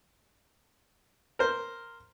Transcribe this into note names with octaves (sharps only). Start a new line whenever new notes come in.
A#4 C5